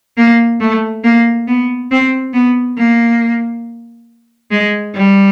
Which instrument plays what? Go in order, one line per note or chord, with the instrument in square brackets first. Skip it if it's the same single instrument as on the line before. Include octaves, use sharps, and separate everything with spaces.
[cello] A#3
A3
A#3
B3
C4
B3
A#3
G#3
G3